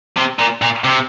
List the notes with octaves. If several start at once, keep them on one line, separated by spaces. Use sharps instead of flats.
C3
A#2
A#2
C3